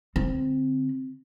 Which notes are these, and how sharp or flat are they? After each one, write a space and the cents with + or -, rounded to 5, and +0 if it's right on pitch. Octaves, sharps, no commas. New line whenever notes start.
D3 -20 C4 +0